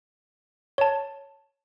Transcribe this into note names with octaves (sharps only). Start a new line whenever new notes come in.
C#5 A5